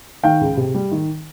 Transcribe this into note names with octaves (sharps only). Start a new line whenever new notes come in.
D#3 F5 G5
C#2
C3
G3
D#3